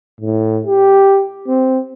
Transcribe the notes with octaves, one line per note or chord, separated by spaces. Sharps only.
A2
G4
C4